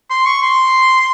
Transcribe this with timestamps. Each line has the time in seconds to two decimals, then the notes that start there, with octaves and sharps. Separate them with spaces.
0.11 C6
0.26 C#6
0.42 C6